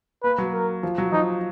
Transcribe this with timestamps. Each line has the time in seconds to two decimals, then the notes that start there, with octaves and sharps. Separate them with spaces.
0.23 A#3 B4
0.38 F#3
0.53 A#4
0.83 F3
0.98 F#3
1.12 F3 D#4